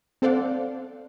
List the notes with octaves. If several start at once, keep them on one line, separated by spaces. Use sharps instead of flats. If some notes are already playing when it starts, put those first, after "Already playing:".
C4 A4 C5 D5 F5 F#5